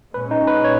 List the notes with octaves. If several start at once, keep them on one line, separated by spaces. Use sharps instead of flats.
A#2 G#3 C#4 B4
D#4
B4
C#5